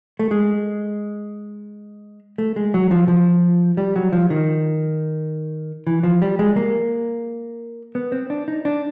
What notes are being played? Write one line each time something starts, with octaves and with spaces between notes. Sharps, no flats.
A3
G#3
A3
G#3
F#3
F3
F3
G3
F#3
F3
D#3
E3
F3
G3
G#3
A#3
B3
C4
D4
D#4
D4